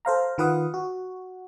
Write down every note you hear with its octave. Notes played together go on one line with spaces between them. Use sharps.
A4 C5 F5 A#5
D#3 F4 B4 F5 F#5 D#6
F#4